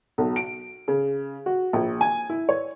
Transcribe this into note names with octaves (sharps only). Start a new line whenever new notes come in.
B1
D7
C#3
F#4
A#1
G#5
E4
C#5